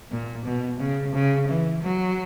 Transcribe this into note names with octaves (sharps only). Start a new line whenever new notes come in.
A#2
B2
C#3
C#3
E3
F#3